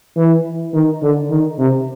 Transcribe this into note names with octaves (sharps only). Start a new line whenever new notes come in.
E3
D#3
D3
D#3
C3